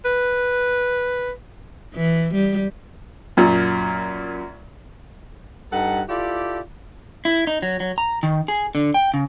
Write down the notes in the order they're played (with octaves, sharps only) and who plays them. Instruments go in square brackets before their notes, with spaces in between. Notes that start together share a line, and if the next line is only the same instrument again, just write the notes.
[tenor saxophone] B4
[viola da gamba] E3
G3
[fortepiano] F#2 A#2
[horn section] G2 D#4 A4 F#5
E4 F4 G4 A4 D5
[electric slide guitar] E4
D#4
F#3
F#3
A#5
D#3
G#4
D3
G5
C#3